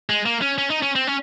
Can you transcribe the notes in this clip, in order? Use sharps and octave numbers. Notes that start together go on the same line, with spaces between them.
G#3
A#3
C#4
C#4
D#4
C#4
C4
C#4